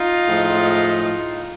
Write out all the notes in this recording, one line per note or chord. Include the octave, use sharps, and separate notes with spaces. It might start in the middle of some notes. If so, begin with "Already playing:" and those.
Already playing: D#4 F4
A2 F3 G#3